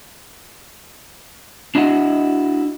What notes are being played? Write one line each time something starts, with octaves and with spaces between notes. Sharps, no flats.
D4 E4 F#4 D#5 F#5